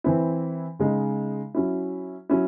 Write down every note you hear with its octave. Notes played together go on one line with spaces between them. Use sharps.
E3 C4 E4
C#3 G#3 D#4
F#3 C#4 E4
F#3 C#4 E4